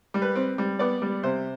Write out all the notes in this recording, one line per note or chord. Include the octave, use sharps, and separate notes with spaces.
G3
B4
C4
G3
B3 D5
G3
C3 C5